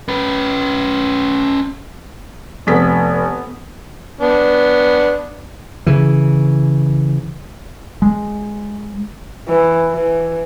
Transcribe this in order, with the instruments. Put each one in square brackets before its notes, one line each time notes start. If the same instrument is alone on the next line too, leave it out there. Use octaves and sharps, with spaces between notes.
[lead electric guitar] C#4 B4
[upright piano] F1 [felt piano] B3 B6
[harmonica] B3 D4
[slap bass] C#3 E3
[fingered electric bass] G#3
[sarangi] E3
E3